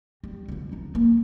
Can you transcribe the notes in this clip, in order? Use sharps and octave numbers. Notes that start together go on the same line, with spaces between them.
G3
F2 D3
D4 D#4
A#3